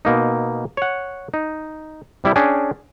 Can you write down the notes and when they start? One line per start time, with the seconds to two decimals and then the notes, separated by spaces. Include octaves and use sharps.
0.05 B2 A#3 D#4
0.77 C#5 F#5
1.34 D#4
2.24 C3 G3 E4
2.36 C#4 D4 G#4 G5